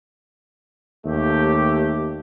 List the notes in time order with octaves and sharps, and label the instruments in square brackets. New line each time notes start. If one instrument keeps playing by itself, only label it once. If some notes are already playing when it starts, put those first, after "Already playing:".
[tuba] D#2 [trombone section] A3 G4